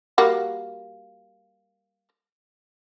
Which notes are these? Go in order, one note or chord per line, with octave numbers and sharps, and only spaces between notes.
G3 A#3 F#4